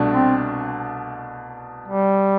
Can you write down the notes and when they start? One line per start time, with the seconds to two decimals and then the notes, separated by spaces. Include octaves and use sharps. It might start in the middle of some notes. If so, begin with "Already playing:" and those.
Already playing: C2 B2 A3 D4
0.12 C4
1.88 G3